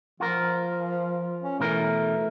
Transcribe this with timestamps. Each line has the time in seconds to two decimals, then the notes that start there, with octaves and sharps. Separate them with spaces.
0.20 F3 F4 A#4
1.42 C#4
1.60 B2 E3 A3 A#4